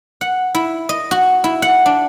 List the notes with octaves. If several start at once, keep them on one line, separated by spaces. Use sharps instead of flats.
F#5
E4
D#5
F#4
E4
F#5
D4